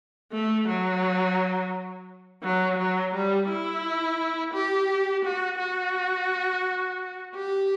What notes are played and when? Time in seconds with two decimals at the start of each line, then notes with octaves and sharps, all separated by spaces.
0.32 A3
0.68 F#3
2.43 F#3
2.78 F#3
3.14 G3
3.49 E4
4.54 G4
5.25 F#4
5.59 F#4
7.35 G4